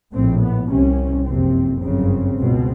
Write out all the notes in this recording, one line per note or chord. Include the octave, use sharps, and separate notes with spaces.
A#1 A2 C4
B3
C2 C3 C#4
F#1 F2 C3 C4
G1 F#2 C#3 C4
C#2 B2